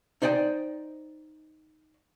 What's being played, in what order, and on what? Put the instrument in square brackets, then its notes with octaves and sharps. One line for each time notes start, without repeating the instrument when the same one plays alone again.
[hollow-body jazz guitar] D#4 C5 D5 D#5 G5